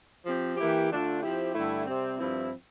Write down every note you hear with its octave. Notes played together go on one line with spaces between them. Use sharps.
F3 C4 G4
E3 A#3 E4 G4
D3 A3 D4 F4
F3 C4 E4 G4
G2 D3 A3 E4
C3 G3 C4
G2 F3 C4 E4